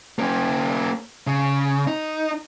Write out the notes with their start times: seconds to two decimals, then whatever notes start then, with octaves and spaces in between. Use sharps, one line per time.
0.19 A#3 C#4
1.27 C#3
1.87 D#4